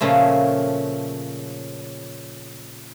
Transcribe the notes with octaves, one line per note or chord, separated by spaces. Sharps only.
A#2 C#3 F3 A3